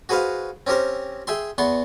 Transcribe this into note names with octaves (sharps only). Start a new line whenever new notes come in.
F#4 G#4 B4 C5 F5
C4 C#4 G4 A#4 C5
G#4 E5 G5 C6
E2 B3 C6 C#6